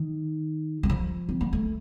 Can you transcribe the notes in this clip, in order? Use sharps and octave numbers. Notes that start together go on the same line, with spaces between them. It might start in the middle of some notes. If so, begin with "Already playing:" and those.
Already playing: D#3
F#3
F3
C4
A#3
A3